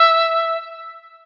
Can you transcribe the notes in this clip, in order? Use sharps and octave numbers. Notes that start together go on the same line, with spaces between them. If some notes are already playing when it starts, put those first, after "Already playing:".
Already playing: E5